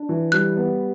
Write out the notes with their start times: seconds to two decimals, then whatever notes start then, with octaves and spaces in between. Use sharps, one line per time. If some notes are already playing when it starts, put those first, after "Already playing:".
Already playing: D4
0.09 E3
0.32 G3 F#6
0.56 B3